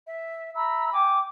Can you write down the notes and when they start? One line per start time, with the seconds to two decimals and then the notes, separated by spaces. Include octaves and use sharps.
0.06 E5
0.55 E5 A#5 B5 E6
0.93 G5 G#5 D6